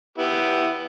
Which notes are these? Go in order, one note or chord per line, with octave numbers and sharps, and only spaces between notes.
B3 E4 G4